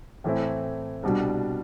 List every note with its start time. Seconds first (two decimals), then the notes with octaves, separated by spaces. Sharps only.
0.24 A2 E3 A3 C4 E4
1.03 C2 B2 G3 D4